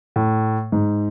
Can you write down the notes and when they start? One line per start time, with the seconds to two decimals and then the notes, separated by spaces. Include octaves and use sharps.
0.16 A2
0.72 G#2